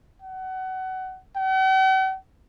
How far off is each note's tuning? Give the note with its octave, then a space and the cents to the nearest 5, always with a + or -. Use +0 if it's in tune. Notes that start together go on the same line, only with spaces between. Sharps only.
F#5 +25
F#5 +45